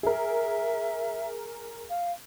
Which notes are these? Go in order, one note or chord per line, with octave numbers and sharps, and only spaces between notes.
G#4 A#4 E5
F5